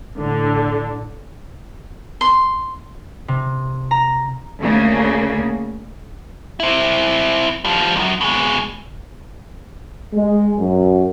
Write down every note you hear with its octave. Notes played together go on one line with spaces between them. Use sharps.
A2 D3
C6
C3
A#5
D2 C#3 A#3
C4 E4
F3 G3
C2 F#2
B2 G#3
G#3
F#2